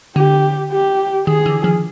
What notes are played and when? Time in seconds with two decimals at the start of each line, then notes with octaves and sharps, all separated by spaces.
0.16 D3 G4
0.72 G4
1.27 D#3 G#4
1.46 D3 E3
1.64 D#3 F3